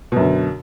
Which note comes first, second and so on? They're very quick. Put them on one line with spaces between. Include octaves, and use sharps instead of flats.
B2 F#2 D3